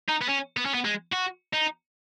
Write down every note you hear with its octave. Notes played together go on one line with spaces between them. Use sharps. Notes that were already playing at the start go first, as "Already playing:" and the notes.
D#4
B3
C#4
B3
C#4
B3
G#3
F#4
D#4